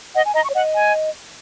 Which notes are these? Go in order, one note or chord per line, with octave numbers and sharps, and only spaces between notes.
D#5 F#5
G#5
D#5 A#5
C#6
C#5
D#5 F#5
G#5